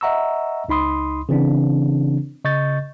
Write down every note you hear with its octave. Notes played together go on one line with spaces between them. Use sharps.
D#5 E5 F#5 A#5 C#6 E6
C#2 D#4 B5 C6 D#6
C#3 E3 C4 D4
C#3 D#5 C#6 G6 A6